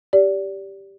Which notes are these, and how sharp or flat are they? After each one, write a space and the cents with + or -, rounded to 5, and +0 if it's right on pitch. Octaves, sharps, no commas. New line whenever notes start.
G4 +0 D5 -25